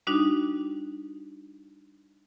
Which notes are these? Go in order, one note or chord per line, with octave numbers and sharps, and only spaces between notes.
G3 D4 D#4 F#4